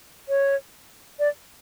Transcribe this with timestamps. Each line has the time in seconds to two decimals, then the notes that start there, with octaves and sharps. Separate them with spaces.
0.29 C#5
1.19 D5